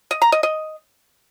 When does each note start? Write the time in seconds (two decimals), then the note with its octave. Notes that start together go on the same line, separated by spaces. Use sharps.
0.11 D#5
0.22 A#5
0.32 D#5
0.43 D#5